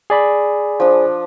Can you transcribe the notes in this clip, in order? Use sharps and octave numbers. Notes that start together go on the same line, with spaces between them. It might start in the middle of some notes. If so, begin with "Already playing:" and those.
G#4 D5 B5
F3 D4